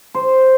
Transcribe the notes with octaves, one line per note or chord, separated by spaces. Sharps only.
C5